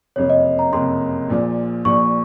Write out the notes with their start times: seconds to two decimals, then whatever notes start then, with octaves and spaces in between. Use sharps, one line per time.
0.16 F#1 F2 C3 C#5
0.30 D#5
0.59 A#5
0.72 F#1 F2 C3 C6
1.29 A#1 A#2 F3
1.85 A#1 A#2 F3 C#6